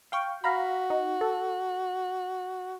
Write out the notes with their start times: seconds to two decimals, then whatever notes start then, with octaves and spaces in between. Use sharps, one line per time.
0.12 F5 G5 C#6
0.44 F#4 F5 A#5 B5
0.90 D#4
1.21 A4